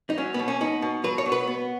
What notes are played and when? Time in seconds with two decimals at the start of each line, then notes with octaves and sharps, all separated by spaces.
0.10 D#4
0.18 F#3 C#4
0.34 B2 B3
0.48 C#4
0.61 B3 D#4
0.82 B2
1.04 F#3 B4
1.18 C#5
1.26 B2
1.32 B4
1.48 B3